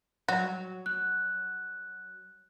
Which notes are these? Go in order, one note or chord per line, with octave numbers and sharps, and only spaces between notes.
F#3 F#4
F#6